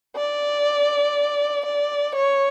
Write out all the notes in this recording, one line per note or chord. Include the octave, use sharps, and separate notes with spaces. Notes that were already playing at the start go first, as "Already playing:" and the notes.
D5
D5
C#5